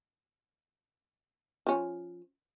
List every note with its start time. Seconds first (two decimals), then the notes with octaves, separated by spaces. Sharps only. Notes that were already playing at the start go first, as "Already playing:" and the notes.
1.67 F3 C#4